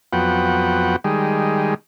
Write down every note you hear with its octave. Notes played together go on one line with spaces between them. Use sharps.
F2 F#3 B3 F#5 G5
D#3 G3 G#3